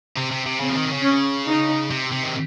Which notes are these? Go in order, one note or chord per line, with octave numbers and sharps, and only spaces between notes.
C3
C3
C3
C#3 C4
F3
D#3
C3
C#3
C#4
D#4
C3
C3
D#3